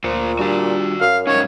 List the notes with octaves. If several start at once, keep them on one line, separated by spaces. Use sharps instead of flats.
D2 A#2 A#3 F4 C5 C#7
G3 D4 F4 F#4 D5
F#2 F5
G#2 D#3 F#3 C#4 C#5 F5